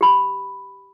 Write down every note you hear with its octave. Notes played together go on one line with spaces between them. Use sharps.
G4 B5